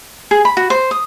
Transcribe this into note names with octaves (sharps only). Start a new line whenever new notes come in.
G#4
B5
F#4
C5
D#6